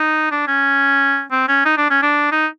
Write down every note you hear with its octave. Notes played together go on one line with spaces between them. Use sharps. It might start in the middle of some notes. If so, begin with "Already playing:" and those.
Already playing: D#4
D4
C#4
C4
C#4
D#4
D4
C#4
D4
D#4